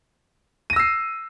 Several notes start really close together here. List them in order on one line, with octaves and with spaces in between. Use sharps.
D#7 A#6 E6 C7